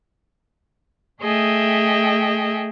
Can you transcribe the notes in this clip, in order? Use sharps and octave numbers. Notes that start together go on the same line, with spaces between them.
A3 G#4 D#5 E5 G5